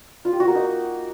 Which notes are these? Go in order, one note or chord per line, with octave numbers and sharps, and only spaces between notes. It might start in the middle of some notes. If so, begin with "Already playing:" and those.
F4
G4
F#4
A#3
D#4